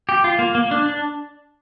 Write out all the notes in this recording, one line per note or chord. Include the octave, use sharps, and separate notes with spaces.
G4
F4
A#3
A#3
D4
D4